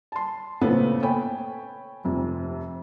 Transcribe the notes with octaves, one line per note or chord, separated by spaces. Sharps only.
A5 C6
A#2 C#3 A3 B3 C4
A4 C#5 G5 G#5 B5
F1 F2 C3